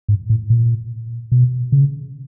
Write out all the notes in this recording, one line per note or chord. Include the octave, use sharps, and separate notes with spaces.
G#2
A2
A#2
B2
C#3